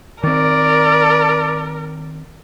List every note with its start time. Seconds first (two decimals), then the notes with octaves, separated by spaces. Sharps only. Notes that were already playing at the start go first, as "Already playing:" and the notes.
0.23 D#3 C4 A#4 D5